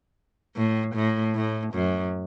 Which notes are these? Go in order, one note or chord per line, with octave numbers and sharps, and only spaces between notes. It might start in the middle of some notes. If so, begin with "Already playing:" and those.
A2
A2
A2
F#2